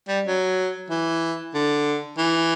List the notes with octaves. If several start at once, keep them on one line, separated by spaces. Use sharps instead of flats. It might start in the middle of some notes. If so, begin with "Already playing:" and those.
G3
F#3
E3
D3
E3